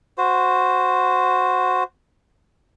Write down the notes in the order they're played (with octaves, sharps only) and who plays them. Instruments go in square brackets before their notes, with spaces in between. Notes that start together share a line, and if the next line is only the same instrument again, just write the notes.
[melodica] F#4 C5